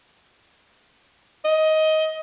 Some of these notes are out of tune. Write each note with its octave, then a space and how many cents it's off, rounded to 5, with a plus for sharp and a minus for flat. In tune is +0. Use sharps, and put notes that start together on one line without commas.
D#5 +15